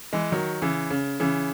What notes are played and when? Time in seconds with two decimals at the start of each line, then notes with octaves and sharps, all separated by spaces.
0.13 E3 G#3
0.32 D#3 F#3
0.62 C#3 E3
0.90 C#3
1.20 C#3 E3